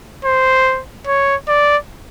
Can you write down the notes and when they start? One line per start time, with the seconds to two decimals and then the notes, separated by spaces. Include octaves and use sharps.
0.25 C5
1.07 C#5
1.48 D5